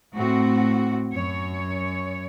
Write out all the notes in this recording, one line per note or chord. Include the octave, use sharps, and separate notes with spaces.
A2 C4 F#4
F#2 C#5